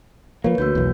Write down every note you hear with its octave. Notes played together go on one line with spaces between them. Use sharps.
F3 A#3 B4 C#5
D2 A#3 F#4 G6
B1 E2